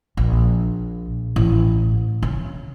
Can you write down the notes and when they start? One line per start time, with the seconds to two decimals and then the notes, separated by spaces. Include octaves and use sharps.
0.17 A#1
1.36 A1
2.23 C#3